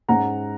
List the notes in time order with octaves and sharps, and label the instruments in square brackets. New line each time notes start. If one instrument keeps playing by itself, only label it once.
[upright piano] G#2 G#3 C#4 F#5 A#5